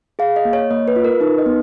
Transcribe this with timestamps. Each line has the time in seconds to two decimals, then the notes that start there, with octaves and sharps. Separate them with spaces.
0.19 G#4 F5
0.36 D#5
0.45 A#3
0.53 C#5
0.71 A#3 D#5
0.88 B4
0.96 F4
1.04 A#4
1.21 D#4 B4
1.38 D#5
1.46 B3